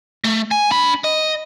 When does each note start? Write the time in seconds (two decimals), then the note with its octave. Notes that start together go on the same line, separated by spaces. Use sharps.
0.24 A3
0.51 G#5
0.71 D4 B5
1.04 D#5